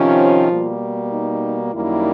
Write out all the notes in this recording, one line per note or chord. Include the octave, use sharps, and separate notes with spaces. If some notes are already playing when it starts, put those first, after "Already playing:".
Already playing: C3 D#3 F3 C#4 F4
B2 G3 A#3
D#4
F#2 D#3 G3 A#3 D#4 E4